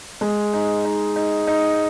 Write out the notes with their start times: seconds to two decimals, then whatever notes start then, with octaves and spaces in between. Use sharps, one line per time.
0.21 G#3
0.53 D#4
0.84 D#4
1.16 D#4
1.47 D#4